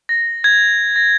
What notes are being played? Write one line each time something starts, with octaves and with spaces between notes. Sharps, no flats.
A#6
G#6
A#6